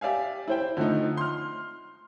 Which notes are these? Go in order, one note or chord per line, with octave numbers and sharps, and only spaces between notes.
G4 D5 E5 F5 G#5
E4 C5 G5
D3 F3 A3 D#4
C6 F6